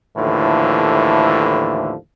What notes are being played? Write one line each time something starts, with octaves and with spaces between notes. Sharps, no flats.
D#2 A2 D3 E3 F3